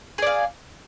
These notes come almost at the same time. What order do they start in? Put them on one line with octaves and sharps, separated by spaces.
G#4 D5 F5